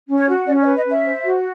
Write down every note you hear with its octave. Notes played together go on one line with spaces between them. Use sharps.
C#4
C#5
F#4
C#4 D5
D5
B4
D#5
C#4 E5
C5
F#4